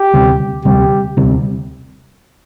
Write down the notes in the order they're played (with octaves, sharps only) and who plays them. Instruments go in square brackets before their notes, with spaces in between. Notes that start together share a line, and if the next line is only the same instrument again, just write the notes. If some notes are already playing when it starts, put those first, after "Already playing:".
Already playing: [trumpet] G4
[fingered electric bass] D2 C3 G3 C4
[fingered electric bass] D2 C3 G3 C4 [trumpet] G4
[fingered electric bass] D2 C3 G3 C4